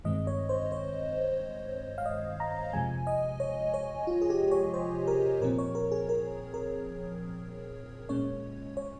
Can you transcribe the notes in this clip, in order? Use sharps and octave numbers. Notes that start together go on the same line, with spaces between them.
G2 D#3 G#3 C4 D#5
C#5
C5
C#5
F5
D#5
A#5
F2 C3 F3 G#3 G#5
D#5
C#5
C#5
F4
G#4
G4
C#5
C5
A#4
A#2 F3 C4 A#4
C#5
A#4
G#4
A#4
A#4
A#2 G#3 C#4 C#5
C#5